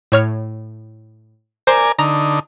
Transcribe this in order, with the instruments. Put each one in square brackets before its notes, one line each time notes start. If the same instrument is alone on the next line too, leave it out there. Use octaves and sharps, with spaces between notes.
[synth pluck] A2 C#5 F6
[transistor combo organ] A#4 D5 G#5 [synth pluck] C5
[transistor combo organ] D3 D#4 [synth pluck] A#5